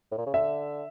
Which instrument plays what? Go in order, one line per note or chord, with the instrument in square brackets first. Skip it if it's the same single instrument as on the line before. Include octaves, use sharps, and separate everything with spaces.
[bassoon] A2
A#2
C#3
[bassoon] D3 [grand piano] E5